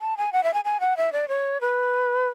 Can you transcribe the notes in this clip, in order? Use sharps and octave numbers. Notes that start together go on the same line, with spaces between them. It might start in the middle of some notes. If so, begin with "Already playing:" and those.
A5
G#5
F#5
E5
G#5
G#5
F#5
E5
D5
C#5
B4